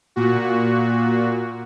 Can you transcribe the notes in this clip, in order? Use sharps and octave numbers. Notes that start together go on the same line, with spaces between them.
A#2 F#4